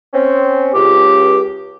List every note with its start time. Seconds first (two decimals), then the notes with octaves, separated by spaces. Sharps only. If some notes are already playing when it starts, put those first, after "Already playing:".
0.13 C4 C#4
0.74 C#2 G4